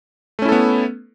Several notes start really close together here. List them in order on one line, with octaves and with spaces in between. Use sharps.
A3 C#4 E4 A4 B3